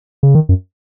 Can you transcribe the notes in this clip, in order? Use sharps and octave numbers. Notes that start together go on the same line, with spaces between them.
C#3
D#3
F#2